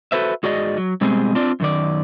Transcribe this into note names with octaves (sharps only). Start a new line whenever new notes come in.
F#4 A4 B4 C5 E5
G#2 F#4 G#4 D5 D#5
F#3
B2 G3 G#3 C4 G#4
C4 D4 F4 D5
F#2 D#3 D5